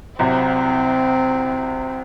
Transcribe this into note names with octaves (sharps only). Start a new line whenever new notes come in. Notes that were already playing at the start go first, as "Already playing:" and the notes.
C2 C3 F#3 C4